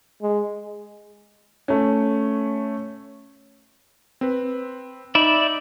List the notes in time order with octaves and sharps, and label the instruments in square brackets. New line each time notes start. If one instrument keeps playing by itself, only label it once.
[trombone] G#3
[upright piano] A3 C#4
[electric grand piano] C4 B4
[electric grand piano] D#4 [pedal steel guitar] D5 E5 B5